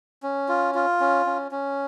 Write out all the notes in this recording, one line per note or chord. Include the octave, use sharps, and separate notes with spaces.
C#4
F4
F4
C#4
C#4
C#4